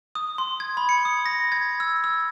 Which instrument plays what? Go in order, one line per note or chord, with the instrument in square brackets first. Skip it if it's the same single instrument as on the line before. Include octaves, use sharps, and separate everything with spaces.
[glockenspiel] D#6
C6
G#6
B5
C#7
D#6
A#6
G#6
E6
E6